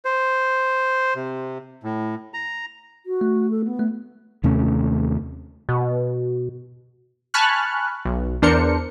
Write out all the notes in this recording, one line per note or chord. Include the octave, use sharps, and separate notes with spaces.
C5
C3
A2
A#5
F#4
A3
A4
B3
A3
D#2 C3 A3 C#4
B2
G#5 A5 B5 C#6 F6 F#6
B1
E2 D4 A#4 C5 C#7